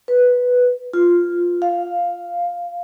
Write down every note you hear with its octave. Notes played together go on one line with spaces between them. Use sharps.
B4
F4
F5